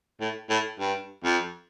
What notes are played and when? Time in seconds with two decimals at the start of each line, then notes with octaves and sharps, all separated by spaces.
0.20 A2
0.50 A2
0.80 G2
1.24 F2